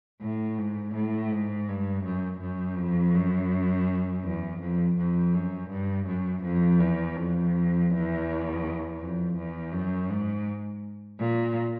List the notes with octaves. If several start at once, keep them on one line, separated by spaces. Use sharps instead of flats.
A2
G#2
A2
G#2
G2
F#2
F#2
F2
F#2
E2
F2
F2
F#2
G2
F#2
F2
E2
F2
E2
F2
E2
F#2
G#2
A#2